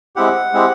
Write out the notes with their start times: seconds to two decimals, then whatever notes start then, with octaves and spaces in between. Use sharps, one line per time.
0.16 G#3 C4 E4 G4 F#5
0.53 G#3 C4 E4 G4